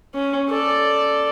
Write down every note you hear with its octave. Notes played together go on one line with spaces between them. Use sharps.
C#4
A4 D5